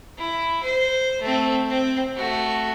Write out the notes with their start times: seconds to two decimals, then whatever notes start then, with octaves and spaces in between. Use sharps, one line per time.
0.18 E4
0.63 C5
1.21 A3 C4
1.70 C4
2.16 A3 F#4